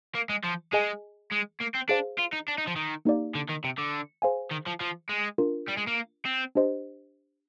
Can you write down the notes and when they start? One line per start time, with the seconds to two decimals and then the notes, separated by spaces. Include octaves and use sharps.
0.15 A#3
0.29 G#3
0.44 F3
0.73 G#3 G#4 D#5 G#5
1.32 G#3
1.61 A#3
1.75 C4
1.89 D4 G#4 C5 F5
2.18 F4
2.33 D#4
2.48 D4
2.58 D#4
2.67 F3
2.76 D#3
3.05 A#3 D#4 G4 D5 F5
3.35 D3
3.49 D#3
3.65 C3
3.78 D3
4.22 G#4 C5 F5 G#5
4.51 D#3
4.66 F3
4.80 F3
5.09 G#3
5.38 D4 F4 A#4
5.68 G3
5.77 G#3
5.87 A#3
6.25 C4
6.55 D4 G4 C5 D#5